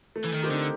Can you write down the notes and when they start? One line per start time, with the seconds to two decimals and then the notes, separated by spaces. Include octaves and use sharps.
0.16 A3
0.25 E3
0.33 D#3
0.42 C4 D#4 G4 A#4
0.51 D3